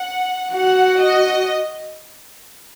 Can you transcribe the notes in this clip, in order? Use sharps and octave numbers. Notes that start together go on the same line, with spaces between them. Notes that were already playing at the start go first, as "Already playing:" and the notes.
Already playing: F#5
F#4 F#5
D#5